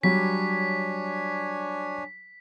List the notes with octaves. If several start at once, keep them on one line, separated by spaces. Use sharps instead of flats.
F#3 G3 D4 C#5 G#5 B6